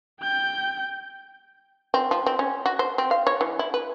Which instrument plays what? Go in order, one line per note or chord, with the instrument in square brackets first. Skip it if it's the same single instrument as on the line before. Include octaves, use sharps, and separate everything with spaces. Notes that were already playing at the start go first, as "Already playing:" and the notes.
[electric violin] G5 G6
[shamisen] C4
F3
C4
C#4
F#4
C5
C4
F5
C#5
E3
E4
B4